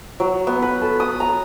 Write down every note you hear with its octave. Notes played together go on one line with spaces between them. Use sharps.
F#3
B3
B4
A4
D#6
A#5